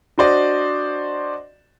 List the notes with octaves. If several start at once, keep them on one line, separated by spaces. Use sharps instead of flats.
D4 F#4 C5 D5 D#5